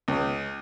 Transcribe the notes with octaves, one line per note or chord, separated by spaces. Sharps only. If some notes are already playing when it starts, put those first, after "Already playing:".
C#2